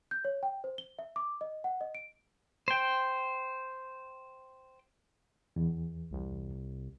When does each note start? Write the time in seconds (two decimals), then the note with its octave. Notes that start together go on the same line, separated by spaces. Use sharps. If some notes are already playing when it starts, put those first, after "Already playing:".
0.11 G6
0.25 C#5
0.43 G5
0.64 C5
0.78 G7
0.99 E5
1.16 D6
1.41 D#5
1.64 F#5
1.81 D#5
1.95 D7
2.68 C5 G5
5.56 E2
6.11 C2